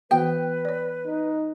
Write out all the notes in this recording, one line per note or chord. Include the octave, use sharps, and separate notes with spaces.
E3 B3 F#4 B4 G5
C#5 D5
D#4